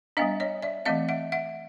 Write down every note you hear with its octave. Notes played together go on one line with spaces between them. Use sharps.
G3 B3 D4 D#5 F5
C#5 D#5
D5 E5
E3 A3 C4 D#5 F5
E5 F#5
E5 F#5